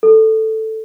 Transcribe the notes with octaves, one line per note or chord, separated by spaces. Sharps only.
A4